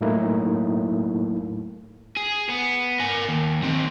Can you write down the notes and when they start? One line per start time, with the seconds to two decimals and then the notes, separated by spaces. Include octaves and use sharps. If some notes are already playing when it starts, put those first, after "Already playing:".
0.01 A2 F#3 A3 A#3 D#4 E4
2.17 G#4
2.50 B3
3.00 A#4 G#5
3.29 D#2
3.63 D#3 C4